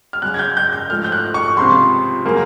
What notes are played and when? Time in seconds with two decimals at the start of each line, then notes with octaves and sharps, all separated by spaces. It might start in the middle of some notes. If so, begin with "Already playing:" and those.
0.13 F6
0.22 F#2 C#3 F#3 F#6
0.34 G#6
0.39 G6
0.57 G6
0.72 G6
0.90 G#2 F3 A3 F6
1.04 G6
1.12 F#6
1.34 C#6
1.57 C#2 C3 F3 C6
2.25 C#3 F#3 A#3